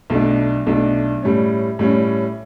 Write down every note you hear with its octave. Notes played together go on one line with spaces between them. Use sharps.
B1 B2 A3 D4
B1 B2 A3 D4
A2 G3 C#4
A2 G3 C#4